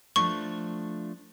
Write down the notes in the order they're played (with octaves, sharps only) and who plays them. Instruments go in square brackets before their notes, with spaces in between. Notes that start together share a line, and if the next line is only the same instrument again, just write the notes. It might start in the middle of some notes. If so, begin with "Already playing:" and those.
[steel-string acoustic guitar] F3 A3 D4 [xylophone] C#6